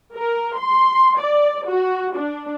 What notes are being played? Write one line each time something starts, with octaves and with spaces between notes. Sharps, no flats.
A#4
C6
D5
F#4
D4